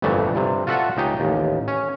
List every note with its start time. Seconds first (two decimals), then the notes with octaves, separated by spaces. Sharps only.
0.02 G1 F2 A#2 E3 A3 E5
0.35 G2 C3
0.67 F4 F#4 A4 E5 F#5
0.97 C#2 D#4 G4 G#4 G5
1.20 A1 D#2
1.68 C#4